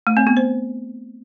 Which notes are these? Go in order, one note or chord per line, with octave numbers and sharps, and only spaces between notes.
A3
C4
B3
C5